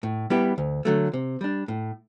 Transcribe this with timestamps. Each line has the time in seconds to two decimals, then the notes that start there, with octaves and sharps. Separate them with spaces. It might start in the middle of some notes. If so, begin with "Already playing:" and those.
0.03 A2
0.30 G3 B3 E4 G4
0.58 D2
0.85 D3 F#3 A3
1.13 C3
1.41 G3 D4
1.68 A2